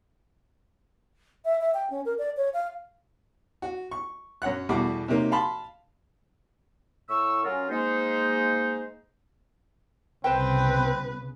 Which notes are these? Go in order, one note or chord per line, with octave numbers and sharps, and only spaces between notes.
E5
E5
G5
C#4
A#4
D5
C#5
F5
F#4
C#6
F#2 C#5 F#5 F#6
E2 B2 G3 A3 F#4 D6
C3 F#3 A#3 D#4
F5 A5 B5 C6
A2 C#6 E6
F#3 C#4 F4 A#4
G#3 A#3 D#4 C5
C2 C#3 B3 C4 B4 C5 G5